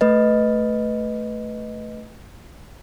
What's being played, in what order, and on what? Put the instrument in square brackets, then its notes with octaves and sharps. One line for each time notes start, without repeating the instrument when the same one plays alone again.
[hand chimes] A3 B4 D#5